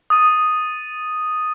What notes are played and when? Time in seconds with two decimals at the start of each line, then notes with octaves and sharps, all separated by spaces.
0.10 D#6 A6 D#7